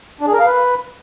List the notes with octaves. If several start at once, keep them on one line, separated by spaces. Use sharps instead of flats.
D4
G#4
A#4
F5
B4